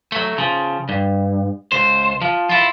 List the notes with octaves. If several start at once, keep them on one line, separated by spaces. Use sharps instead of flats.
F#3 A3
C#3 F3
G2
C#2 C5
F3
E4 F4